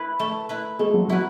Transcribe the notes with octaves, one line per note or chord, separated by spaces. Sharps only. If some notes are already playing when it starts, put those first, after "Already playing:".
Already playing: E4 B4
A3
E4 B4
G#3 A3 G#4
F#3 F#4
F#3 E4 F#4 B4